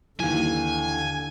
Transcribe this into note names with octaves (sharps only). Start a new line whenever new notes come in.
D#2 D3 E3 G#5